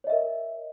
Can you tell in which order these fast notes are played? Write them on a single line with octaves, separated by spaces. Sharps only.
C#5 D#5 E5 A#4